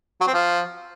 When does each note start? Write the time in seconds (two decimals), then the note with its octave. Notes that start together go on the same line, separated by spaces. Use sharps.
0.21 F#3
0.27 C4
0.34 F3